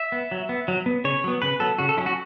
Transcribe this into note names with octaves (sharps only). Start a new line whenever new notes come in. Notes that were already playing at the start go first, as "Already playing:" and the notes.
Already playing: E5
B3
F#3
B3
F#3
B3
C#3 C#5
F#3 B3
C#3 B4
F#3 B3 A4
C#3 F#4
A4
F#3 C#4 E4
F#4